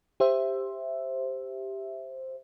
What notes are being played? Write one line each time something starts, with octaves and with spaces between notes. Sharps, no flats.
G4 C5 E5